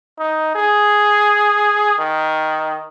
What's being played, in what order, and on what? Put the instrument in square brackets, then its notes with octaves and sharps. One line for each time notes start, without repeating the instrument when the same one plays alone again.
[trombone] D#4
G#4
D#3